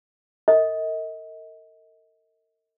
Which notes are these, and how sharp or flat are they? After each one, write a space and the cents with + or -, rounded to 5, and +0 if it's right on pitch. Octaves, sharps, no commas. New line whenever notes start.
A#4 -45 D#5 +35